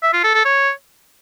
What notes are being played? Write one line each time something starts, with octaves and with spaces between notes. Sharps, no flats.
E5
F4
A4
A4
C#5